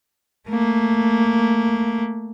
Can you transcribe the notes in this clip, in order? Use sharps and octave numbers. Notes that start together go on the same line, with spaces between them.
A3 A#3